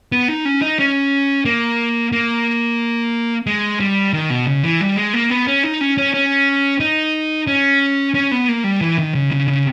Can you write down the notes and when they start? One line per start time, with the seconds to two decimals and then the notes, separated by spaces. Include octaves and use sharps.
0.12 B3
0.28 D#4
0.45 C#4
0.62 D#4
0.79 C#4
1.45 A#3
2.12 A#3
3.47 G#3
3.80 G3
4.13 D#3
4.30 B2
4.47 C#3
4.64 E3
4.81 G3
4.97 G#3
5.14 A#3
5.30 B3
5.47 C#4
5.64 D#4
5.81 C#4
5.98 C#4
6.14 C#4
6.80 D#4
7.47 C#4
8.15 C#4
8.31 B3
8.49 A#3
8.64 G3
8.81 E3
8.98 D#3
9.15 C#3
9.32 C#3
9.48 C#3